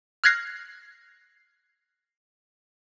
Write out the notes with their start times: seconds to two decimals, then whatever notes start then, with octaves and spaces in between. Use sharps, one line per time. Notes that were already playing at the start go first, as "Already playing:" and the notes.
0.24 F6 F#6 G#6 A#6 C7